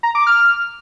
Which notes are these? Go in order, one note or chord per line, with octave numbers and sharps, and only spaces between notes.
A#5
D6
F6